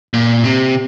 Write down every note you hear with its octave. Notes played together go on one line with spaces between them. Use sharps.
A#2
C3